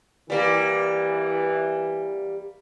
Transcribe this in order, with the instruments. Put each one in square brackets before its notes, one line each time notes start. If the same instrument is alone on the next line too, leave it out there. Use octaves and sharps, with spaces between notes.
[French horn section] E3 [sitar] G3 A#3